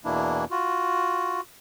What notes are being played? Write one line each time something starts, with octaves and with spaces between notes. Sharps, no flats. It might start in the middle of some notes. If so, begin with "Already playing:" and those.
E2 B2 E3 A#3 D4 E4
F4 F#4